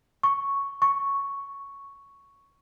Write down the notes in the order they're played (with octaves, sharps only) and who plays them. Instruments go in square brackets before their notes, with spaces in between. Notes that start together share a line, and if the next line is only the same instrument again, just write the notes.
[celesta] C#6
C#6